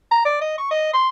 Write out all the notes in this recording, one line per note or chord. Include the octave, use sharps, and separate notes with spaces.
A#5
D5
D#5
C#6
D#5
C6